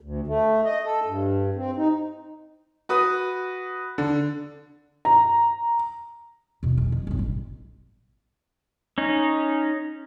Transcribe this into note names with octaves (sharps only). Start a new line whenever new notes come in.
D2
A3
D#5
A4
G2
C4
D#4
F#4 B4 D#6
D3
A#5
E2 B2
G#3
F2
B1 G2
A1
C#4 D#4